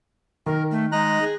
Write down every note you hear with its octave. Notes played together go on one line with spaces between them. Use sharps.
D#3 A#4
A3
G#3 D#4 A#5 F#6
G#4